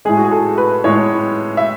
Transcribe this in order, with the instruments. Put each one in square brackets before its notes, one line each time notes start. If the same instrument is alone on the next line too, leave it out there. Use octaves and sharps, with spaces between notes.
[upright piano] A2 G#3 G#4
F#4
G#4
A4
B4
A2 G#3 C#5
E5